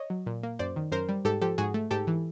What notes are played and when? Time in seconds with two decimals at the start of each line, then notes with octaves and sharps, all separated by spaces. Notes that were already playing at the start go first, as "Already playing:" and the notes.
Already playing: C#5 D#5
0.10 F#3
0.26 A#2
0.43 A#3
0.59 F#2 C5 D5
0.76 D#3
0.92 F#2 A#4 C5
1.09 G3
1.25 G#2 G4 A4
1.42 F3 G4 A4
1.58 G#2 F#4 G#4
1.74 A3
1.91 G#2 G4 A4
2.07 E3